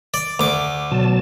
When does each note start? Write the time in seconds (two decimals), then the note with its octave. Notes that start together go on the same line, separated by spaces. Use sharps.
0.14 D5
0.39 D2 D6
0.91 B2 F#3 A5